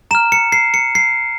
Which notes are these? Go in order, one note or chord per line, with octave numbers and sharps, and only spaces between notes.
A#5 F6 E7
C#7
C7
C#7
C7